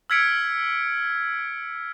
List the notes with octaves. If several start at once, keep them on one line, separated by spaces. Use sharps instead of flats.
E6 F6 G#6 B6 C#7 D7